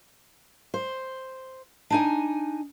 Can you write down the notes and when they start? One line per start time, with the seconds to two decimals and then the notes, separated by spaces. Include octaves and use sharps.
0.74 C5
1.90 D4 D#4 G#5